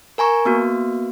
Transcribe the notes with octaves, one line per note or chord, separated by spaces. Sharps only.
A#4 G#5 A#5 C#6
A#3 B3 F#4